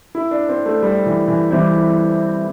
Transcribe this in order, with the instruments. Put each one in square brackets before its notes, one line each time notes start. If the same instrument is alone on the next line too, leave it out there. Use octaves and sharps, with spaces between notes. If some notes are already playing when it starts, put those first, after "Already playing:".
[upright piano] E4
D4
C4
A3
G3
E3
E3
[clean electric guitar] E3 G3 C4 E4